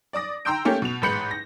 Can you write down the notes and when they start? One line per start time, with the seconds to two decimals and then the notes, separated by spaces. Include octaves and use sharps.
0.13 D5 D6 D#6 A#6
0.45 G5 A#5 C6 E6 G6 D7
0.65 A3 A#3 C#4 G4
0.82 B2 F7
1.02 A1 G#2 B4 G6 C#7 F#7
1.31 A#6